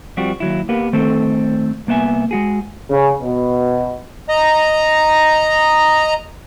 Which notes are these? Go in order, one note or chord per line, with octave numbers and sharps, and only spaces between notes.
F3 G3 C4 F#4
D#2 F#3 E4
A#3 B3 G4 A#4 B4
D#3 A3 C4 A4 C5
C2 A#3 B3 E5 G#5
G#3 F#4 G#4
C#3
B2
D#5 A#5